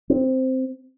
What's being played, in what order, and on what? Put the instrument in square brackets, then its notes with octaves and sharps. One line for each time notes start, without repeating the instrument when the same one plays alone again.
[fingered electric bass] C4